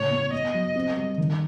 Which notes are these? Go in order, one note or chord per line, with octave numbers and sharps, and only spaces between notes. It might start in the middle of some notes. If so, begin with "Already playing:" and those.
Already playing: A2 C#3 C#5
B3
B3 D#5
F#3
C4
G3
D#3